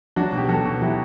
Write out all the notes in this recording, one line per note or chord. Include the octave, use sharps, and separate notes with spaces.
F#3 D4 F#4
B2 G4
F#3 F#4 A4
B2
F#3 E4 G4